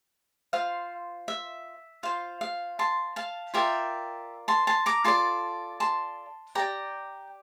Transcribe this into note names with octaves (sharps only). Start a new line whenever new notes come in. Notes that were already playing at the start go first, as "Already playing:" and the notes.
F4 C5 F5
E5
F4 C5 F5
F5
A5 C6
F5 A5
F4 A#4 D5 E5 G5
A5 C6
A5 C6
A#5 D6
F4 A4 D5 A5 C6
A5 C6
G4 D5 G5 A#5